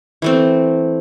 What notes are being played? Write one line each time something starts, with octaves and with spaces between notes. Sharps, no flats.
E3 A3 C4